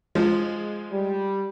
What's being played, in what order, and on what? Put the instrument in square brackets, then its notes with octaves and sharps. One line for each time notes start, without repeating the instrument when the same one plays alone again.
[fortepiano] F3 [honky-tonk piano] G#3
[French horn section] G3